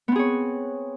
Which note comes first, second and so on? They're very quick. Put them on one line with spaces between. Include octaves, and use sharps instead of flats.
B3 C4 G#4 C#5